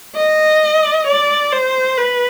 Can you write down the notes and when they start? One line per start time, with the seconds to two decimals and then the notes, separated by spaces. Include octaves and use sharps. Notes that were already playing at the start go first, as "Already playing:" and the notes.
0.16 D#5
1.07 D5
1.52 C5
1.97 B4